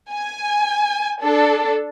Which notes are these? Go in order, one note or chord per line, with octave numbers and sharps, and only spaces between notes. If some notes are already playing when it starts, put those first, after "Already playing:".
G#5
D4 A4